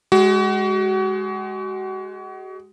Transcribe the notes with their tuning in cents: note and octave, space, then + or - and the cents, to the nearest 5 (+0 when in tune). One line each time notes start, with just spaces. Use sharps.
G#3 +0 F#4 +35